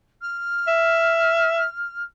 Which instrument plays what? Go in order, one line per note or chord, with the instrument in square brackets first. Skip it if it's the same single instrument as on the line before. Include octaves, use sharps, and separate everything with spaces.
[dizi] F6
[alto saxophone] E5